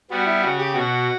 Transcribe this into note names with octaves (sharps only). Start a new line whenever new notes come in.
G3 B3 F#4
E4
C#3 F#4
G4
B2 F#4